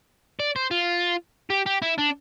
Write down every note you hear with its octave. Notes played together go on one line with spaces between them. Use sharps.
D5
C5
F4
G4
G4
E4
D4